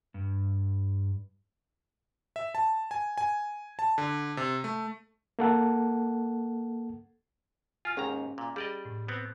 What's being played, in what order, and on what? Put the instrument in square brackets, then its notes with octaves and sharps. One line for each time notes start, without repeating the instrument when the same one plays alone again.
[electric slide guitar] G2
[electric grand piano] E5
A5
G#5
G#5
A5
D3
C3
A3
[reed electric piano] A#3 A4 F#5
[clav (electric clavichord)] F4 [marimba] G#5 F6
[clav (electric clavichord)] D#2 G#2 A#5 [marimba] C#4 G#4 G5
[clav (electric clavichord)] A#2
[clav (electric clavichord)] G3 D5 D#5 [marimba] G#4
[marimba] A2
[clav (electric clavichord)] B3 C4